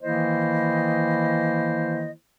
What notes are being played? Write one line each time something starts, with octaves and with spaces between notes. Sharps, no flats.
D#3 E3 A#3 E4 C5 D#5